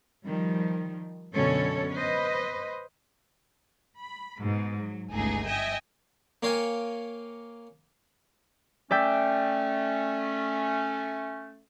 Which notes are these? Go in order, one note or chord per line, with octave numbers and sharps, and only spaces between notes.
D#3 F3 G3
F#2 B2 D3 C#4 A4 C#5
B4 C5 D#5
B5
G#2 B2
F#3
G1 C#2 A3 D#4 G#4
D#5 E5 G5 G#5
A#3 C#5 F5 G5 G#5
A3 C#4 D5 E5 G5